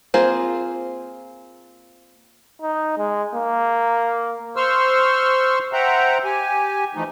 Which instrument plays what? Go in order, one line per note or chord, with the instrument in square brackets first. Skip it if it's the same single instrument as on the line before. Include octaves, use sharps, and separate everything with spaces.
[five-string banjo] A#3 C4 F4 G#4 C5
[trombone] D#4
G#3
A#3
[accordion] C5 C6 C#6 E6 F6
C5 E5 F#5 G5 A#5
G4 G#5
E3 F3 A3 D#4